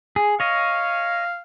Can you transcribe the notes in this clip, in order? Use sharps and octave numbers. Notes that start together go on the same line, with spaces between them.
G#4
C#5 D#5 F5